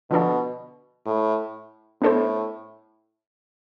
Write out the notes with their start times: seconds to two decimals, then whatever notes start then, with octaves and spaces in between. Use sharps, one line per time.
0.11 B2 D3 F3 B3 D4 A4
1.06 A2
2.02 A2 B3 D4 A4 C5